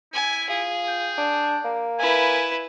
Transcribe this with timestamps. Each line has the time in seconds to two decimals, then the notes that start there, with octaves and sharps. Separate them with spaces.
0.13 E4 G#5
0.49 F4 G#4
0.88 G5
1.18 D4
1.65 A#3
1.99 E4 B4 G#5